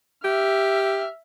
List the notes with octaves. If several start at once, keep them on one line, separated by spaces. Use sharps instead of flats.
G4 E5 F6